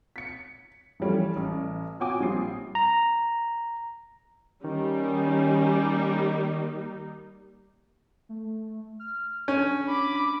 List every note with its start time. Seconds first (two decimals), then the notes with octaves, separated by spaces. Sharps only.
0.16 B6 C#7
1.00 E3 F3 G3 A3 C#4
1.36 A1
2.00 F4 F#4 C#5 G5 G#5 D6
2.20 A#1 G3 C4 F4 D#6 C7
2.75 A#5
4.64 D#3 G3 A#3 C#4 D#4
8.29 A3
8.99 F6
9.48 C#4 D4
9.89 D4 B5 D6